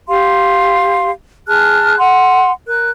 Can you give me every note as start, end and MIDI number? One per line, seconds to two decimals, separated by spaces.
0.09 1.11 67
0.09 1.11 77
0.09 1.11 84
1.48 1.98 68
1.48 1.98 81
1.48 1.98 89
1.48 1.98 90
1.98 2.52 78
1.98 2.52 84
2.67 2.89 70
2.67 2.89 90